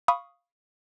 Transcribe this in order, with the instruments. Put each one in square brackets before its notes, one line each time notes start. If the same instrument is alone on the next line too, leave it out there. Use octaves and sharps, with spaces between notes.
[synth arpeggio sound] F5 B5 C#6 D#6